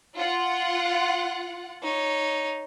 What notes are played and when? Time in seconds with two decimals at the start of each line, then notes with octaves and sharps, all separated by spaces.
0.17 F4 F#5
1.83 D#4 C#5